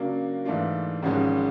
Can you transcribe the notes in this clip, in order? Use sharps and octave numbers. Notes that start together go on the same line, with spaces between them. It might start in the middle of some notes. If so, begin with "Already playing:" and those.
Already playing: C#3 F#3 A#3 D4
G#2 E3 A3 D4 F4
G#1 G#2 F3 G#3 C#4